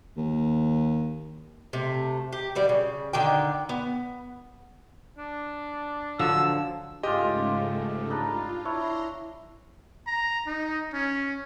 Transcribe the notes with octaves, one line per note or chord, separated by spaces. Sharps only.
D#2
C3 A3
G4
D3 G3 D5
C#3
D3 D#3 D5 G5
B3
D4
D3 F3 F#3 E6
G#2 C#3 G#3 A3 F4 G4 D#5
D4 D#4 F4 B5
D4 E4 C#5 A#5 C6
A#5
D#4
C#4